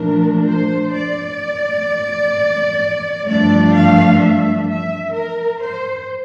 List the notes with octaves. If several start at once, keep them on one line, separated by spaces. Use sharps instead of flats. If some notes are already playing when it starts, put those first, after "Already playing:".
Already playing: A#2 F3 A3 D4 A#4
C5
D5
G2 F3 A3 D4 D5
F5
E5
E5
A#4
C5